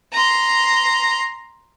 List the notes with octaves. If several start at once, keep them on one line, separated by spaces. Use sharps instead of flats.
A#5 C6